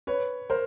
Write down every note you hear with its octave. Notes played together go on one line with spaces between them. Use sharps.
B4 C#5
A#4 C5